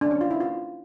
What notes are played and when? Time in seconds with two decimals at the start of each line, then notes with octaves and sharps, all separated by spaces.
0.01 D4
0.11 C#4
0.21 F4
0.31 E4
0.40 F4